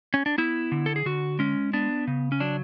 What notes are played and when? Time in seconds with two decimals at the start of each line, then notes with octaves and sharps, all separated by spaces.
0.14 C#4
0.26 D4
0.38 B3 E4
0.72 D3
0.86 A4
0.96 G#4
1.06 D3 F#4
1.39 G#3 C#4
1.73 B3 D4
2.07 C#3
2.32 C#4
2.40 F#3 D4